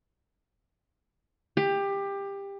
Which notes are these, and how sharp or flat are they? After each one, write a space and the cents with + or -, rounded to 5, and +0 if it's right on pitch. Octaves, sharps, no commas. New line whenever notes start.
G4 +20